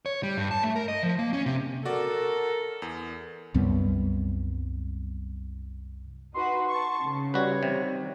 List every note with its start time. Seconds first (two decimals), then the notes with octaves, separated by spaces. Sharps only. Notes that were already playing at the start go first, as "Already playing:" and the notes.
0.06 C#5
0.23 G3
0.38 G2
0.51 A5
0.63 A3
0.76 A#4
0.88 D#5
1.03 F3
1.19 A#3
1.33 C#4
1.46 C3
1.85 F#4 A4 A#4 D5
2.82 E2
3.54 C2 F#2 G3 B3
6.34 D#4 F#4 B4 C6
6.70 A5 C#6
7.02 C#3
7.34 G3 F#4 B4 C#5
7.63 C3 D#3